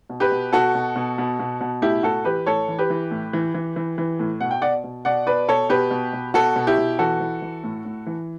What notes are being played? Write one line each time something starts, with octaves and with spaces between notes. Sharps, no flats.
B2
G4 B4
B2
B2 F#4 A4
B2
B2
B2
B2
B2
A2 E4 G4
A2 F#4 A4
E3 G4 B4
A2 A4 C#5
E3
G4 B4
E3
A2
E3
E3
E3
E3
A2
B2 F#5
G5
B2 D5 F#5
B2
B2 D5 F#5
B2 B4 D5
B2 A4 C#5
B2 G4 B4
B2
B2
B2 F#4 A4
B2
E4 G4
B2
E3 F#4 A4
E3
E3
A2
A2
E3